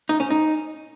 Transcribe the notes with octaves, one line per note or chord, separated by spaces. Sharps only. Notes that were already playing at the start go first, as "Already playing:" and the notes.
D#4
C#4
D#4